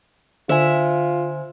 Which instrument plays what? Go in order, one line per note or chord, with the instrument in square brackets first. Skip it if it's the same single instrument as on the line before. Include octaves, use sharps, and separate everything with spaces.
[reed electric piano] D3 [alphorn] F4 [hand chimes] C5 G#5 [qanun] E5